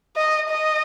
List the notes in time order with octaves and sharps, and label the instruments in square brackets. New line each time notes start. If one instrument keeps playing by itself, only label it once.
[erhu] D#5
D#5